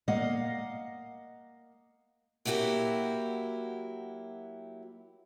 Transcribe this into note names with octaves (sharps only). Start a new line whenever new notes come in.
A#3 D#5 F5 F#5
F#3 A#3 E4 F#4 G4